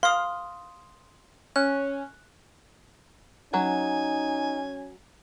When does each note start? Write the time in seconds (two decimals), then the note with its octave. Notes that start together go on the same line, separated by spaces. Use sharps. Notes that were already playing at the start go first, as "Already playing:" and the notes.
0.03 F5 C6 D#6
1.56 C#4 F#6
3.54 F#3 C#4 D#4 G#5